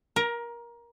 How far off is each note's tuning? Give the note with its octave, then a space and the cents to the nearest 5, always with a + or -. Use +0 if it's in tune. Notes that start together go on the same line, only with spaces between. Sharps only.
A#4 +20 A#5 +0